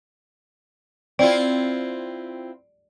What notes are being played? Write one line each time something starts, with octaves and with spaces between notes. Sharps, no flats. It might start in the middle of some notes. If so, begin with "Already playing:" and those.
C4 E4 F4 D5